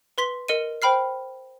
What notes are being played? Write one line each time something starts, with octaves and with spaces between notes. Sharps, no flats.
B4 C6 B6 G7
A#4 D#5 C#7 D#7
C5 G5 B5 F6 C7